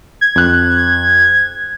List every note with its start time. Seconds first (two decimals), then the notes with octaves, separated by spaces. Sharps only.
0.21 G#6
0.36 F2 F#6